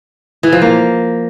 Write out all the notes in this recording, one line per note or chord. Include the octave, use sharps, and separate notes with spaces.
E3
F3
A#3